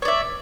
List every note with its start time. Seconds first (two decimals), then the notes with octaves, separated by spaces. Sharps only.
0.02 C#5
0.05 D5
0.08 E5